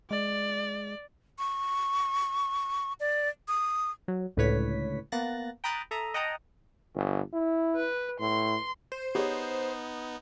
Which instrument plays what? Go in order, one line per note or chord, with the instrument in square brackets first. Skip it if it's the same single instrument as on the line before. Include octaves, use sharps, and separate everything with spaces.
[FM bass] G#3 [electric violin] D5
[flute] C#6
D5
D#6
[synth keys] F#3
C#2 A2 D3 B4 C#5 B6
A#3 B3 F#6 A6 A#6
G5 A#5 B5 D#6 F#6 A6
A4 E5 A#5 D#6
D#5 F#5 G5 A5 A#5 D#6
[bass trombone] G1
E4
[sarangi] B4
[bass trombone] A2 [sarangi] C6
[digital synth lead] C5
[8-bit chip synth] B3 D#4 [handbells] G4 G#4 C#5